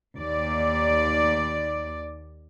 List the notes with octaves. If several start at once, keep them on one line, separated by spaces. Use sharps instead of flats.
D#2 D5